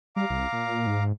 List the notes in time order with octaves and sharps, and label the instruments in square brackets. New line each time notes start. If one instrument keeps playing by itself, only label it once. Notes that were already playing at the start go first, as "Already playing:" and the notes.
[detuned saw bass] G3 [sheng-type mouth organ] F5 A#5 D6
[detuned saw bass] C2
A#2
G#2